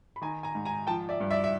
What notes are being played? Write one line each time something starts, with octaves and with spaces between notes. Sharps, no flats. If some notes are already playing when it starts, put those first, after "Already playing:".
B5
D#3 G#5 A#5
G#5 A#5
G#2
G#5 A#5
F3 G5 A5
D5 E5
G2
D5 E5
E5